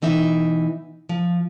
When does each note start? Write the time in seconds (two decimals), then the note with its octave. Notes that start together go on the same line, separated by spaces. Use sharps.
0.02 B2 E3 D#4 E5
1.09 F3